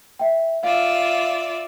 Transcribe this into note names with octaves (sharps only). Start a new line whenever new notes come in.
E5 G5
F4 D5 E5 F5